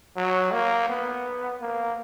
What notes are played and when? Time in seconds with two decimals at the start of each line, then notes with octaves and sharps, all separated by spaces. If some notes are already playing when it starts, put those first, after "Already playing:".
0.16 F#3
0.52 A#3
0.89 B3
1.61 A#3